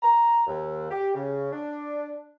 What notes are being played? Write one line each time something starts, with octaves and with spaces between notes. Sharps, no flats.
A#5
D#2
G4
C#3
D4